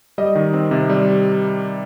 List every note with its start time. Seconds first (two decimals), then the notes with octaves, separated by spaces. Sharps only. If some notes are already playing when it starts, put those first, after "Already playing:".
0.18 G3 D#5
0.35 D#3
0.53 C4
0.71 C3
0.90 G3